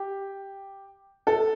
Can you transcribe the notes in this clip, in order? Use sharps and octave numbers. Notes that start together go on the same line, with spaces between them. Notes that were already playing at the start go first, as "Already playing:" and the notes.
Already playing: G4
A4